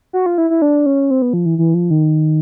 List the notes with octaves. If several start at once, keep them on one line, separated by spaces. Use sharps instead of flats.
F#4
F4
E4
E4
D4
C#4
C4
B3
F3
E3
E3
F3
D#3